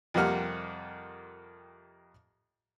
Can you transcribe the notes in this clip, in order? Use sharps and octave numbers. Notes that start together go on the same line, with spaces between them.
F2 C3 G3 A#3 F#5 F6